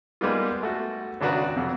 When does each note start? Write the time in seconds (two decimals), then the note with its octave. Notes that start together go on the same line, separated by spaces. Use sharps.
0.21 G3 G#3 A#3 B3 D#4 F4
0.63 A3 F#4
1.21 G#1 C#2 D4 F#4 B4 A#5
1.56 F2 C3